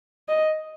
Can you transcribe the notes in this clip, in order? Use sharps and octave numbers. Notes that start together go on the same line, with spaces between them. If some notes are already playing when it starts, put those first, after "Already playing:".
D#5